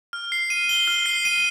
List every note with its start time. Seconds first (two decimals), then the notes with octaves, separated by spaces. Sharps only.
0.13 F6
0.32 C7
0.50 D#7
0.69 G7
0.87 F6
1.06 C7
1.25 D#7